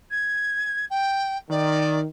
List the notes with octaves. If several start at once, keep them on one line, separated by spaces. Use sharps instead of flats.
G#6
G5
D#3 D5